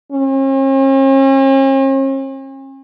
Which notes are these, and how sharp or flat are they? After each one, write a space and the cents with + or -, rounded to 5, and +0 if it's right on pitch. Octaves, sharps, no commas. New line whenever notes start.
C#4 -45